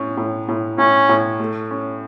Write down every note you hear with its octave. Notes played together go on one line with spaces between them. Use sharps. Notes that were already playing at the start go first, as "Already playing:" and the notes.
Already playing: A2 C#4
A2
A2
A2 C#4
A2
A3
C#4